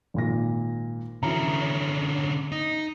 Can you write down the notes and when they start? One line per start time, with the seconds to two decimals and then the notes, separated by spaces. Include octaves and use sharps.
0.14 G#1 A#2 A#6
1.23 D3 E3 C#4 F#4 A#5
2.52 D#4